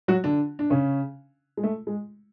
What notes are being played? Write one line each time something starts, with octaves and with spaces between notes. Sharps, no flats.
F#3 F#4
D3 D4
D4
C#3 C#4
G#3
A3
G#3